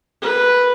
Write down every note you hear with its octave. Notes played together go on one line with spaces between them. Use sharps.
B4